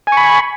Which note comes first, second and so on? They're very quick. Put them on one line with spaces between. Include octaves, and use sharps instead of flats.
G#5 C#6 B5